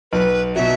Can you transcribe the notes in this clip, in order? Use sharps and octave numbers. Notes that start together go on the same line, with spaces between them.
B1 B4
B2 F#3 E5